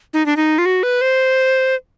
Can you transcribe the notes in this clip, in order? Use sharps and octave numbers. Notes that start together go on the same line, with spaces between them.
D#4
D4
D#4
F4
F#4
B4
C5